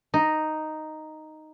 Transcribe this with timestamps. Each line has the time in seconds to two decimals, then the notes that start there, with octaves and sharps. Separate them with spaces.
0.14 D#4